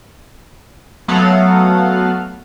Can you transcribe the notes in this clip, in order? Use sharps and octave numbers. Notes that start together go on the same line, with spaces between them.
F#3 A3 B3 A4 F5 F#5